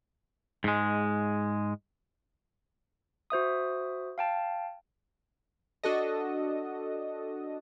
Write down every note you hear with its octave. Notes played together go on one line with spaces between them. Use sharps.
G#2 G#3
F#4 C5 E5 D#6
F5 G5 A5
D4 F#4 A4 D#5